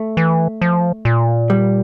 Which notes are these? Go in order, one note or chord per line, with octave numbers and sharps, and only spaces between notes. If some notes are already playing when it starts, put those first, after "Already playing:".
Already playing: A3
E3
F3
A#2
G3